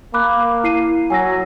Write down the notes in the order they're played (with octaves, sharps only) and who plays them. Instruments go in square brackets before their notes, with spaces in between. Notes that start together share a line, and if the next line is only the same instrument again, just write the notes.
[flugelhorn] A#3 [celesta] B5 D6 F#6
[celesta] E4 C7 D#7
[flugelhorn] F#3 [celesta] G#5 E6 A#6